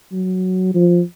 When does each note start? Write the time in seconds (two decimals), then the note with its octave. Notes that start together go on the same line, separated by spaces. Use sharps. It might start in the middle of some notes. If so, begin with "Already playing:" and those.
0.12 F#3
0.75 F3